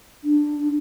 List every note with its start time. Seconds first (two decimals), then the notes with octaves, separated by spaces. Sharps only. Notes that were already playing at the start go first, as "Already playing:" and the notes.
0.24 D4